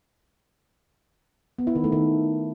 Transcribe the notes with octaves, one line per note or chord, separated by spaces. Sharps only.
B3
E4
D#3
A3
D#3